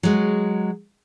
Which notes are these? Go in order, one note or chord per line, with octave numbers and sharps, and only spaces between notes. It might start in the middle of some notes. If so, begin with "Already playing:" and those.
F#3 G#3